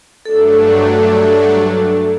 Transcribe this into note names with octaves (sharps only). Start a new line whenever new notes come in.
G2 F#3 A3 D4 A4